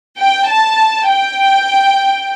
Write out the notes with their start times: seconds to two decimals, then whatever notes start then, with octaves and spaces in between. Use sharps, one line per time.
0.18 G5
0.48 A5
1.09 G5